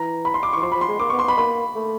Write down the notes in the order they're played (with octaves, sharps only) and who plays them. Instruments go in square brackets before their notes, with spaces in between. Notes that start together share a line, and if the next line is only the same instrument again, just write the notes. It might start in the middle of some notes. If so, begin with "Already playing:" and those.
Already playing: [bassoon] E3 [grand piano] A#5
[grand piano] B5
C6
D6
C#6
[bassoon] E3
[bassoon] F3 [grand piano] C6
[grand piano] B5
[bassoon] F3
[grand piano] C6
[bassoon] G#3
[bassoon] A#3 [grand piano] D6
[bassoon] B3 [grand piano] C#6
[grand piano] C6
[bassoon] B3 [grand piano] B5
[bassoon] A#3 [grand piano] B5
[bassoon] A3